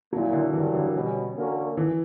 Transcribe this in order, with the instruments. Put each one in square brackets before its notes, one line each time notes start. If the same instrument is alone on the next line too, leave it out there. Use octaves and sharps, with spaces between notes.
[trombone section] A#2 A#3 C#4 E4 [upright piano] F#3
[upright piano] D3
[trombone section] G2 F#3 C#4 G4 A#4 [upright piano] E3
[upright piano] D3
[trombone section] B2 G3 C#4
D3 A#3 C#4 F#4 A#4
[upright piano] E3